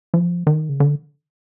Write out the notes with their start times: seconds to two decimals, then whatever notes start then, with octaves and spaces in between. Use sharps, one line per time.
0.14 F3
0.47 D#3
0.69 C#3
0.80 D3